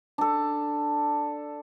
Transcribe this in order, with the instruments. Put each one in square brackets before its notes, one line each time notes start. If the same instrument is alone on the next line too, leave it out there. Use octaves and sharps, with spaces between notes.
[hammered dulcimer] D4 A4